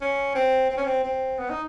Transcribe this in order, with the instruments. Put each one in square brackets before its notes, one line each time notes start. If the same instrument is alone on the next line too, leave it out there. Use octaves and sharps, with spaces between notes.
[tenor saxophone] C#4
C4
C4
C#4
C4
C4
B3
D#4